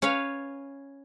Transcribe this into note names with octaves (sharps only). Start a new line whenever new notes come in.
C#4 B4 C#5 F5